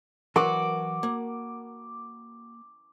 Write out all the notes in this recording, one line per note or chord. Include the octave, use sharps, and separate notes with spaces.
E3 F#3 F#4 A#4 C6 D6
A#3